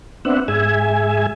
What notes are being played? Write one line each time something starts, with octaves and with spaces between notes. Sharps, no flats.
B3 C4 D4 E5 F#5
G#2 G#4 E5 G#5